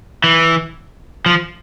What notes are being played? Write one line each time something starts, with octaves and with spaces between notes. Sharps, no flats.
E3
F3